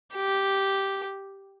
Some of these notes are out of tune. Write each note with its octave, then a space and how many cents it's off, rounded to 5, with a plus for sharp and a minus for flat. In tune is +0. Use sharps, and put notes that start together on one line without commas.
G4 -5